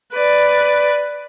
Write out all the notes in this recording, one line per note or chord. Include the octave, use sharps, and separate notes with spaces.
B4 D5